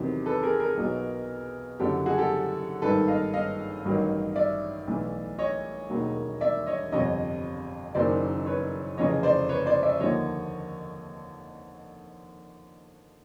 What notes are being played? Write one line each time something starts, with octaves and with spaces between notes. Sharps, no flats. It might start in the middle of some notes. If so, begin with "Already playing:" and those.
Already playing: E2 C3 D#3 F#3
A4 B4
G#4 A#4
G#4 A#4
B1 B2 F#3
F#1 F#2 D3 F#3 G4 A4
F#4 G#4
G4 A4
G#1 G2 D#3 A4 B4
D#5 F5
D#5 F5
A1 G2 D#3 F#3
D5 E5
B1 A2 E3
C#5 D#5
E1 D#2 D#3 F#3
D5 E5
C#5 D#5
G1 F2 C3 C#5 D#5
F#1 F#2 D#3 F#3 C5 D5
B4 C#5
F1 F2 C#3 E3 C#5 D#5
C5 D5
B4 C#5
C5 D5
D5 E5
D#2 D3 F3 C#5 D#5